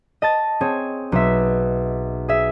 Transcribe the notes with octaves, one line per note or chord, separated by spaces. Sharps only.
D#5 A5 A6
C4 G#4 C#5
B1 E5
G#4 E5